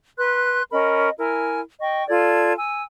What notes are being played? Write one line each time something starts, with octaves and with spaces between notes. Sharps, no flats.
B4 C6 F#6
C#4 A#4 D#5 B5
E4 A#4 G#5
D#5 G5 C#6
F4 A4 D5 G#6
G#5 E6